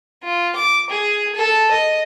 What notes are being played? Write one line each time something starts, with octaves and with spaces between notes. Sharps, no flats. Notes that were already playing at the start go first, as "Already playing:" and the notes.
F4
D6
G#4
A4
D#5